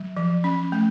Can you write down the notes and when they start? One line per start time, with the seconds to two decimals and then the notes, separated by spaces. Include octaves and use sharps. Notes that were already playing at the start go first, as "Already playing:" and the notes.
Already playing: F#3
0.17 F3
0.44 C#4
0.72 A3